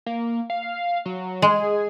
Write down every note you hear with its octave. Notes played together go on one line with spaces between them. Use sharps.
A#3
F5
F#3
G#3 G#4